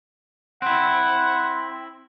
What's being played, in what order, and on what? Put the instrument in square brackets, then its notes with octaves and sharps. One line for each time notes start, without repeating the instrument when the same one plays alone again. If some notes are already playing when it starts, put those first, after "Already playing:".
[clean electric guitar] C4 E4 [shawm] F#5